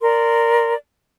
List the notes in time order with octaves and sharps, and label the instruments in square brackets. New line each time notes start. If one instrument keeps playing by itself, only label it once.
[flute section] A#4 D5 C6